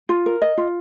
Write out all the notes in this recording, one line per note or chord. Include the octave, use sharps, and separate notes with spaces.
F4
A#4
D#5
F4